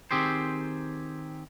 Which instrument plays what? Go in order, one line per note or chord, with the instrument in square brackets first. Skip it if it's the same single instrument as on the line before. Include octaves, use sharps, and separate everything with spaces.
[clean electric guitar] D#3 C4 G4 G#4 C5